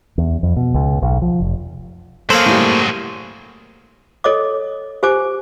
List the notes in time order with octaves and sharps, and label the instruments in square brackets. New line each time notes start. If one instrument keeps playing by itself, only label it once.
[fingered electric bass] E2
F2
B2
C#2
B1
F3
F1
[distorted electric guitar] F#3 G#4 [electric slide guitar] A#3 C5 [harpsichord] A4 C#5 F5
[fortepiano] A2 G3
[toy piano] A4 C#5 D#5 D6
G4 C5 G#5 D6